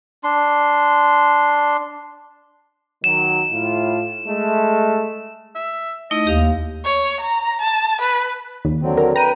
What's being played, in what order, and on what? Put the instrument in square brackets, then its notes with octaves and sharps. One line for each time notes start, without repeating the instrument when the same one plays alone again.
[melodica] D4 C6
[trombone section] D#3 F#3 [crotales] E7
[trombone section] A2 F4
G#3 A3
[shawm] E5
[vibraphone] A3 D#4 E4 [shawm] D#5
[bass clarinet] D#2 [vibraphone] G4 F5
[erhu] C#5
A#5
A5
B4
[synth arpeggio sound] D#2
[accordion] D3 F#3 C4
[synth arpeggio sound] A#4
[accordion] B4 G5 [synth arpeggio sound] A#5 D#7